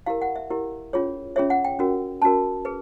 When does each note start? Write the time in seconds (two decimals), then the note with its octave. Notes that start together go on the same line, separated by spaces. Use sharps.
0.06 E4 G4 A#4 F5
0.22 F#5
0.36 E5
0.50 E4 G4 A#4
0.93 C#4 F4 G#4 C#5
1.36 C#4 F4 G#4 C#5 E5
1.50 F#5
1.65 G5
1.79 C#4 F#4 A#4
2.22 C#4 F#4 A#4 A5
2.65 G#4 B4